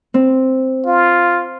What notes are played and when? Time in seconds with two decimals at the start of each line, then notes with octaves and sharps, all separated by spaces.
0.14 C4
0.86 F4